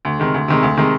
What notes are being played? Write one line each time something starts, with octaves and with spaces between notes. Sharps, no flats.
D2
C3 D#3 G#3
D2
C3 D#3 G#3
D2
C3 D#3 G#3